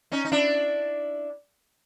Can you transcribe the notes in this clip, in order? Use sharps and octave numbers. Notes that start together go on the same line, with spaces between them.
C#4 D#4
D#4
D4 E4